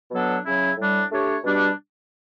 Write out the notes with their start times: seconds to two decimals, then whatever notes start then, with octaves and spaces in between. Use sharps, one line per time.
0.11 B2 F#3 B3 D4 A4
0.44 C#3 F#3 C#4 E4
0.77 A2 G3 D4
1.10 A3 D4 G4 C#5
1.43 B2 G3 D4 G4